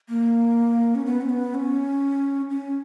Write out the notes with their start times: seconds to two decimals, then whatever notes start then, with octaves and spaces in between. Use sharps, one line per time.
0.09 A#3
0.95 C#4
1.06 B3
1.21 C#4
1.29 B3
1.54 C#4
2.50 C#4